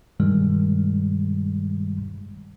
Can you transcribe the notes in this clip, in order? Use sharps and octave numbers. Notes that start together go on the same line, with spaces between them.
G2 B2 D#3 G3 G#3